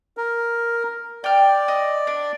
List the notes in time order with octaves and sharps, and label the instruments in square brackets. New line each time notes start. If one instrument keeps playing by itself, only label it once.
[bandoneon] A#4
[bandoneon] D5 [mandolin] G5 F6
[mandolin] D#5
D4